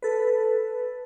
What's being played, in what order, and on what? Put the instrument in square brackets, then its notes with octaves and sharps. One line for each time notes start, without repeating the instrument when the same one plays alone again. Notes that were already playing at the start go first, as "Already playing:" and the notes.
[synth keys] A4 B4